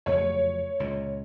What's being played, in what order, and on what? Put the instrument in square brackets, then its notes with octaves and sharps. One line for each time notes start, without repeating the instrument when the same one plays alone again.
[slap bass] F#1 F2 A3 [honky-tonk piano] C#5
[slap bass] C#2 A#2